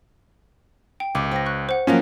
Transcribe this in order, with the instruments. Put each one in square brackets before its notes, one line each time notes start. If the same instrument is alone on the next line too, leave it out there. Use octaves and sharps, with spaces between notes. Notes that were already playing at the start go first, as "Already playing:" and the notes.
[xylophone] G5
[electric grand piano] C#2 [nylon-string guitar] C3 [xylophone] D6
[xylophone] C5 A#6 [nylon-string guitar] G5
[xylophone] C#6 F#6
C5 F#5
[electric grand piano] F3 C#4 [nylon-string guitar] F#3 A#3 E4